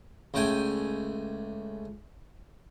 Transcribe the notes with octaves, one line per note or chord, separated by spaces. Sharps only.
C#2 A3 G5 G#5